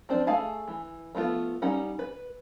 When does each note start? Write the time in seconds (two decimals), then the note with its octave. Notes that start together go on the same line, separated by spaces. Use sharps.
0.09 F3 C4 D4 C5
0.27 A3 G#4 F5 G#5 A5
0.68 E3
1.15 F3 A3 B3 F4
1.62 G3 C#4 D#4 F#5
1.99 B4